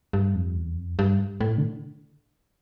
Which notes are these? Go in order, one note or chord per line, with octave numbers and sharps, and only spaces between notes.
G2
F2
E2
F2
G2
A2
D3